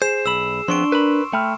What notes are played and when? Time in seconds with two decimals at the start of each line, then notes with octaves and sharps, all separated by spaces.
0.02 G#4 C5 C7 E7
0.26 B1 B5 E6 E7
0.68 F3 B3 C4 D4 C6 C#6 D7
0.92 A#4 B4 B5
1.33 A3 G5 B5 F6